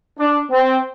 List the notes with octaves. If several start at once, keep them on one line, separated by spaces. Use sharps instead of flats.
D4
C4